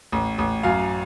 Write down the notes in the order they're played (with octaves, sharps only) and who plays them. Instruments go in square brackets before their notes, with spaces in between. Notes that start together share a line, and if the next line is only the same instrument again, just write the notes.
[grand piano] A1
A1
F#2 F5